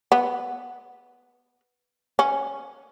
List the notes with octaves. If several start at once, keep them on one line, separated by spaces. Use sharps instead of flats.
B3
C#4